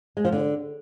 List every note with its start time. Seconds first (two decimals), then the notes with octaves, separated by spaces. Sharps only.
0.17 G#3
0.25 F3
0.32 D3